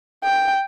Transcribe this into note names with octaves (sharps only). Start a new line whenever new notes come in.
G5